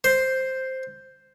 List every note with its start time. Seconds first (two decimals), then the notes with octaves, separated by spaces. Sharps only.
0.04 C5